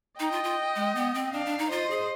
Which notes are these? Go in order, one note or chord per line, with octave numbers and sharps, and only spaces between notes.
D#4 D#5 G5
F4
F4
G#3
B3
C4
D4 D5 F5
D4
D#4
F4 C5 D#5
G#4